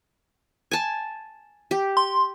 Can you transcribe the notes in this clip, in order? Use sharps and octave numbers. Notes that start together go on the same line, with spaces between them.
G#5 A5
G4
C6